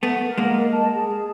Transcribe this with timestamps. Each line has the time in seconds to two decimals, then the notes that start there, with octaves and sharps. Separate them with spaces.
0.03 A3 B3 F#5
0.26 A#4
0.38 G#3 A#3
0.49 D#5
0.72 A5
0.96 G#4